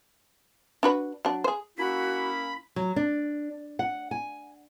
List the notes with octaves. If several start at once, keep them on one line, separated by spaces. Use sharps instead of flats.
D4 F#4 B4
F#3 D4
G#4 C5
A#3 C#4 E4 F#4 B5
F#3
D4
F#5
G#5